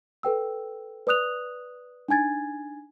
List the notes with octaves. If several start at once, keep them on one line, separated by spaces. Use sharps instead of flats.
A4 B4 G5 E6
B4 D5 D#6 F#6 F7
D4 D#4 G#5 G#6 A6